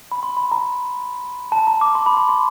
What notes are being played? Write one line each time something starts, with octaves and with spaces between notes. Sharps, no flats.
B5
C6
B5
A#5
A5
A#5
D6
C6
B5
C6
C6